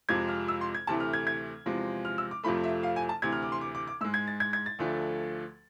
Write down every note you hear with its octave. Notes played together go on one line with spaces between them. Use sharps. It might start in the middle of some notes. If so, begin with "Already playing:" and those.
F2 C3 F3 G#3 G#6
F6
E6
C6
G#6
D2 C3 E3 A3 A5
F6
G#6
G#6
E2 C3 F3 G#3
F6
E6
D6
F2 C3 F3 A3 B5
E5
F5
G#5
A5
D2 C3 E3 G#6
F6
D6
C6
D6
D6
D6
G#2 G#3 E6
G#6
A6
G#6
G#6
A6
D2 D3 F3 A3